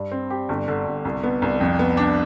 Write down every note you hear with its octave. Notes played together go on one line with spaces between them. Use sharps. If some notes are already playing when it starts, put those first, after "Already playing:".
Already playing: G2
C4
G4
G1
D3
G1
C2
B3
C2
F2
B3
D4